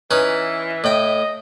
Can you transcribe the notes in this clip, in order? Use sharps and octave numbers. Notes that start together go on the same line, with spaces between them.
E3 C#4 D#4 B4
A2 D#5 G5